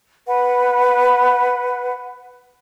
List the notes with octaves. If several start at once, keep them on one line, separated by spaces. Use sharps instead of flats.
B4 F#5